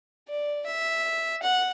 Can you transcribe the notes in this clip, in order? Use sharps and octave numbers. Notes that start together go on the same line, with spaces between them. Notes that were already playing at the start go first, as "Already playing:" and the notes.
D5
E5
F#5